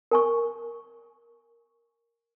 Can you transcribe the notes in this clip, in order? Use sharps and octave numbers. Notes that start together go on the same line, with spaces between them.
A#4 G#5 C#6